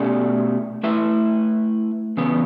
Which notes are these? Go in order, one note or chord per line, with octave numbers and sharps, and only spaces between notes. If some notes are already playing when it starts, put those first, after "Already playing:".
Already playing: B2 A3 C#4 G4 D5
A3 E4 B4 E5
C#3 E3 B3